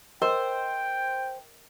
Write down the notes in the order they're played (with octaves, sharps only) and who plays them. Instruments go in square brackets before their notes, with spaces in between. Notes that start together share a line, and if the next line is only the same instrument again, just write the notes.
[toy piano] A#4 D#5 [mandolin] C5 [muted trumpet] G5